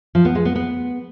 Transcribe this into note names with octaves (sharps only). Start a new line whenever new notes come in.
F3
B3
G#3
B3
B3